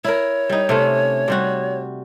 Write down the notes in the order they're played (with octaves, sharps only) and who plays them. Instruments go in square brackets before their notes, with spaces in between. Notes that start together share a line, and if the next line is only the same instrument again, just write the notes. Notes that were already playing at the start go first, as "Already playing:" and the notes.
[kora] E4 A#4 [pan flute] C#5
[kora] G3 D#4
C3 A3 C#4
C3 G3 F#4